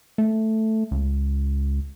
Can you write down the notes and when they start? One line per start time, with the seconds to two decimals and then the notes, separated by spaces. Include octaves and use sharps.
0.18 A3
0.91 C#2